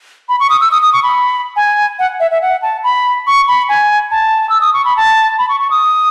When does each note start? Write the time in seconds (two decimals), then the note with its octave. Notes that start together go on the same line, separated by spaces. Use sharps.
0.29 B5
0.40 C#6
0.50 D#6
0.61 E6
0.71 D#6
0.82 D#6
0.93 C#6
1.03 B5
1.56 G#5
1.99 F#5
2.20 E5
2.31 E5
2.42 F#5
2.62 A5
2.84 B5
3.27 C#6
3.48 B5
3.69 G#5
4.11 A5
4.49 E6
4.61 D#6
4.74 C#6
4.85 B5
4.97 A5
5.39 B5
5.49 C#6
5.60 C#6
5.70 D#6